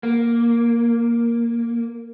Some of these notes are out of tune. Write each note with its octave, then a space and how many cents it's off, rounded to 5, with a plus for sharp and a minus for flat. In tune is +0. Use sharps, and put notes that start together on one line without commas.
A#3 +5